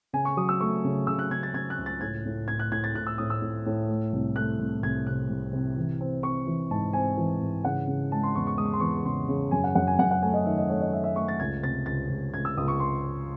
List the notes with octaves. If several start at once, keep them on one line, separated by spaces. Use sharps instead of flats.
C#3 G#5
C#6
F#3 D#6
E6
A3 C#6
C#3
C#3 E6
F#6
C#3 G#6
A6
C#3 G#6
F#6
C#2
A6
A2 G#6
A2
A2 G#6
F#6
A2 G#6
A6
A2 F#6
E6
A2 D#6
E6
A2
A2
A3
C2
A3 F#6
C2
C2 G#6
C3 F#6
C2
C3
E3
C4
C4 C#6
E3
G#2 A5
C4 G#5
E3
G#2
C#3 F#5
C#3
G#3 A5
C6
E2 C#6
C#6
G#3 D#6
C#6
C6
E2 C#6
C#3 C6
C#3
F#2 G#5
F#5
F#2 F#5
G#5
F#2 F#5
F#5
A3 G#5
D#5
D#3 E5
D#5
A3 C#5
D#5
A3 E5
E5
A3 C#6
A6
C#2 G#6
C3 A6
C#2 A6
C#2
C#2 G#6
E6
C#2 D#6
C#6
C6